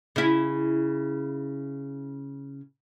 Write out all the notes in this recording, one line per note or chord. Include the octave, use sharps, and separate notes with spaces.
C#3 E4